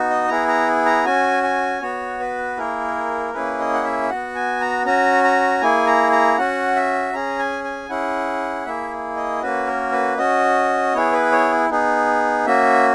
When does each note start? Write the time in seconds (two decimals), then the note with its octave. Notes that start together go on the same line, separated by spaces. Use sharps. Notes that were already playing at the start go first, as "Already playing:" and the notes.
Already playing: B3 D#4 F#4
0.10 D#5
0.29 B3 E4 G#4 A#5
0.48 A#5
0.86 A#5
1.05 C#4 F#4 G#5
1.43 G#5
1.81 B3 F#4 C#5
2.20 B4
2.57 A#3 E4 G#4 A#4
3.33 A#3 C#4 E4 G#4 B4
3.59 D#5
3.74 F#5
3.84 E5
4.09 B3 F#4 F#5
4.35 G#5
4.61 A#5
4.85 C#4 F#4 A#5
5.24 A#5
5.61 A#3 E4 G#4 G#5
5.87 A#5
6.12 A#5
6.38 C#4 F#4 F#5
6.76 E5
7.14 C#4 G#4 A#5
7.39 G#5
7.64 G#5
7.90 C#4 E4 G#4 F#5
8.66 A#3 E4 G#4 E5
9.16 D#5
9.42 A#3 C#4 F#4 B4
9.67 A#4
9.92 B4
10.17 C#4 F#4 D#5
10.94 B3 E4 G#4 C#5
11.13 B4
11.32 C#5
11.70 B3 D#4 G#4
12.45 A#3 C#4 F#4 E5